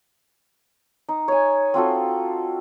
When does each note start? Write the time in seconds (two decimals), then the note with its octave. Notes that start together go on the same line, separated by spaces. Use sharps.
1.09 D#4
1.28 C#5 G#5
1.74 C4 F4 F#4 A4